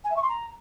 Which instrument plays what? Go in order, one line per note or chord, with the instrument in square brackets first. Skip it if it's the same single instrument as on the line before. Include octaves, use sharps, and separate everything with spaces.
[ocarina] G#5
E5
C#6
C6
A#5